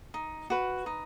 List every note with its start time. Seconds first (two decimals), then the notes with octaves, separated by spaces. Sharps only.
0.14 D#4
0.50 F#4 B4
0.86 D#4